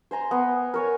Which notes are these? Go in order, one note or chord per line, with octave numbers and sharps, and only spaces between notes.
C5 G#5 A#5 C6
B3
A#4 C#5 G#5